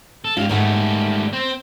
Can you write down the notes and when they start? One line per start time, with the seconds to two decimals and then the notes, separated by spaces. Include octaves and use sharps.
0.25 A4
0.37 G#2 F4 G4 F5
0.49 G#2 D#3 G3 A3 F#5
1.33 C4 C5